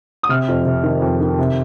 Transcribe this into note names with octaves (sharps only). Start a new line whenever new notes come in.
D#6
C3 F6
F2
C3
D#3
F2
D#3
C3